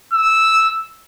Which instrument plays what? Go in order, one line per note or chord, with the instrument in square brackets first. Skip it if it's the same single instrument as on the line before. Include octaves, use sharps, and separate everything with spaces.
[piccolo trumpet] E6